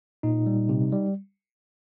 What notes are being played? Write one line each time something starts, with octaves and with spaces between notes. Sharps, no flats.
A#2 D#4
G3
C3
G3